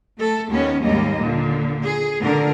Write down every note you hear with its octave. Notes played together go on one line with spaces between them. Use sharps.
A3 A4
D#2 B3 C#4
D#2 G#2 G3 A#3 D#5
A#2 D3
G#4
A#2 D3 A#4